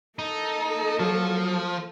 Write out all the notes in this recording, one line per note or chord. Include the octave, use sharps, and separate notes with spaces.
A#3 D#4 A4
F3 F#3